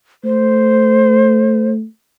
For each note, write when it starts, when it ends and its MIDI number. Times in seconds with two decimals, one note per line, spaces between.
0.24 1.85 57
0.24 1.69 72